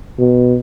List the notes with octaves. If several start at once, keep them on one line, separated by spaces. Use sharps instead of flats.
B2